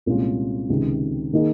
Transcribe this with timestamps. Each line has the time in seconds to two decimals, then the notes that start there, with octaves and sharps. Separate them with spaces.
0.06 C2 A#2 G#3 C#4 F4
0.69 C#2 C3 D#3
1.33 D#3 A#3 D#4 G#4